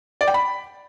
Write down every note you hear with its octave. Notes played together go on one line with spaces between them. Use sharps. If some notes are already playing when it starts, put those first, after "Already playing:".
D5
G5
B5